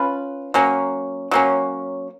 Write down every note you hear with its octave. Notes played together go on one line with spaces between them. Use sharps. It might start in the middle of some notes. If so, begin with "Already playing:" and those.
Already playing: C#4 F4 B4
F#3 A#3 C#4
F#3 A#3 C#4